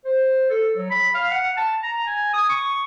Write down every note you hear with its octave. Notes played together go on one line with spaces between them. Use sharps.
C5
A4
F#3
B5
F5
F#5
A5
A#5
G#5
D#6
C#6